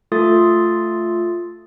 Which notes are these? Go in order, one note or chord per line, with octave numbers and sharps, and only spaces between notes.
A3 F4 A4 C6 D#6 A6